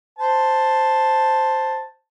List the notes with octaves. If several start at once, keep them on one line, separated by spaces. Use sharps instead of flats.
C5 A5